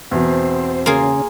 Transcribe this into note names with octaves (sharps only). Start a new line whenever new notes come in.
E2 B2 C4 C5
C#3 A#3 C#4 F4 G#4